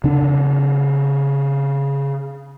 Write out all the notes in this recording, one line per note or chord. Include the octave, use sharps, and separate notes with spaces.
C#3 D4